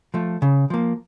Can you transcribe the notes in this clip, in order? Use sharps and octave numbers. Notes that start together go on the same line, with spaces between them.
F3 A3
C#3
F3 A#3